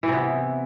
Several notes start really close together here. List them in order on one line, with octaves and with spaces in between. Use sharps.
E3 C3 B3